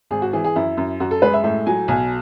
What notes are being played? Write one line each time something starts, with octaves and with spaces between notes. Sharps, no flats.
G#1 G#4
F#4
E3 G#4
G#4
F#2 E4
F#2
F#2 F#4
A4
G#3 B4
E5
A2 E5
F#3 G#5
B1 G#5